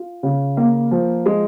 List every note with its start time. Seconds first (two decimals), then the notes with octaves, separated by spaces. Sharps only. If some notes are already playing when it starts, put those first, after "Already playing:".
Already playing: F4
0.23 C#3
0.57 A#3
0.91 F3
1.26 G#3